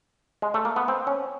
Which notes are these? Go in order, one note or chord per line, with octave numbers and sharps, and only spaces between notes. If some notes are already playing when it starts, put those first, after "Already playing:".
G#3
A3
A#3
B3
C4
C#4